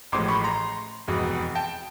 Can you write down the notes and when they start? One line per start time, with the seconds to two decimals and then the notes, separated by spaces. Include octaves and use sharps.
0.12 A1 A2 F3 G#3 C6 D6
0.28 B5 C#6
0.44 A#5 C6
1.08 F1 E2 B2 G#3
1.55 G5 A5